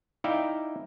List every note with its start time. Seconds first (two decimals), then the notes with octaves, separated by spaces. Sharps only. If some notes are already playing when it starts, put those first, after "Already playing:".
0.24 D#4 E4 D5 E5 F5 G5